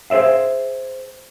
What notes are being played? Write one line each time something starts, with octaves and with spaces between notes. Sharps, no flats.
G#4 C5 D5 E5 F5